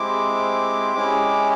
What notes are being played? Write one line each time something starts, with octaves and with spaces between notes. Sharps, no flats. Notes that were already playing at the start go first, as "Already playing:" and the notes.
Already playing: G#3 C4 E4 G4 D6
G#3 C#4 E4 G4